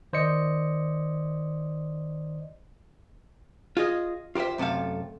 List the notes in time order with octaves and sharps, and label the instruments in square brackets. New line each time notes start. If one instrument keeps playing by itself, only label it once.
[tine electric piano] D#3 C5 D5 D#5 C#7
[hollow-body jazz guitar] F4 G#4 D#5
F4 G4 A#4 C5 E5
F#2 C3 A3 A4 F5